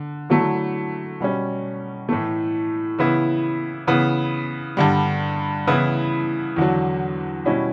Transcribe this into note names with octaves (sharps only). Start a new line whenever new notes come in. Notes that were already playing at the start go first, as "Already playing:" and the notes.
Already playing: D3
D3 F#3 A3 E4
B2 G3 C#4
A2 E3 A3
C#3 E3 B3 E4
C#3 E3 B3
G2 D3 G3
C#3 E3 B3 E4
E2 D3 F#3
B2 G3 C#4 E4